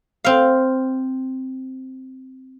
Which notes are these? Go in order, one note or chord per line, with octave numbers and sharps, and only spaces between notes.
C4 F5